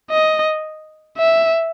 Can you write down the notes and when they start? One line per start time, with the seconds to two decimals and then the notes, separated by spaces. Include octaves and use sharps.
0.11 D#5
1.18 E5